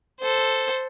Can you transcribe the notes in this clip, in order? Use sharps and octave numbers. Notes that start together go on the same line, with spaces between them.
A4 C5